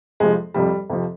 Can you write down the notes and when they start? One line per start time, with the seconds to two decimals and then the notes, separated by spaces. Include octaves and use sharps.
0.20 F2 C3 F3 G#3
0.54 F2 C3 F3 G3
0.90 F2 C3 F3